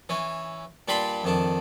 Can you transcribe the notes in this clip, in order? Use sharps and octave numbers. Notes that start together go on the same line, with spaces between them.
E3 C#4
A#2 G3 D4 B4 B5 C6
F2 D#3 D4